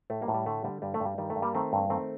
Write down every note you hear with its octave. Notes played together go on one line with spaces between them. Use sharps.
A2 A3
G3 A#3
A2
G3
D3 A3
D3 G3
G2 G3
A3
G2
G3
D#3 G3
A3
G2
G3 A#3
D#3 A3 C4
G2
D#3 A3 C4